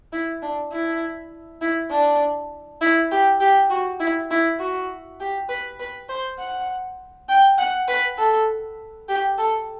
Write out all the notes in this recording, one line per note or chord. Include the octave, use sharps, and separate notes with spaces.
E4
D4
E4
E4
D4
E4
G4
G4
F#4
E4
E4
F#4
G4
B4
B4
C5
F#5
G5
F#5
B4
A4
G4
A4